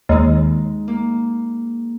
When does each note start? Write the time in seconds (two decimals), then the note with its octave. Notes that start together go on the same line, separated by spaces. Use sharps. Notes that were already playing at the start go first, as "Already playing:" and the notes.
0.09 D#2 G#3 D#4
0.88 A#3